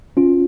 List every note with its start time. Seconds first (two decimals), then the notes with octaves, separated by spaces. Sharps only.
0.17 C#4 F4